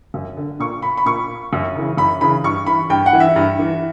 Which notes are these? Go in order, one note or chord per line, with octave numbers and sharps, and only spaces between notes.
F#2
D3
A#2 C#6
B5
B5
A#2 C#6
F#2
C#3 E3
F#2 B5
C#3 E3 B5
G2 C#6
E3 B5
G2 G5
F#5
E3
E5
G2
E3